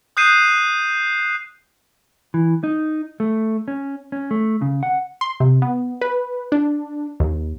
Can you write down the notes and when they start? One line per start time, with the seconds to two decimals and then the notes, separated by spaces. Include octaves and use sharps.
0.17 D#6 F#6 G6 C7 D#7 E7
2.34 E3
2.63 D#4
3.20 A3
3.68 C#4
4.12 C#4
4.31 A3
4.62 C#3
4.83 F#5
5.21 C6
5.40 C3
5.62 B3
6.01 B4
6.52 D4
7.20 D#2